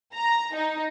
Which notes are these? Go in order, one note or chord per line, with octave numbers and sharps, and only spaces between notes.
A#5
D#4